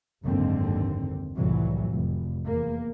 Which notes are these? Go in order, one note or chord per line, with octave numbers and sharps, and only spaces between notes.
F#1 D#2 G#2 D3 C4
C2 F2 A2 E3 F#3
F1
E2 A#3